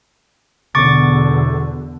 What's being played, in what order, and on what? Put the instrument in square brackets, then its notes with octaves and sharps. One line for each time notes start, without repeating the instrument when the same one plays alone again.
[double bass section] E2 B2 D3 [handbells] C#6 D6 A6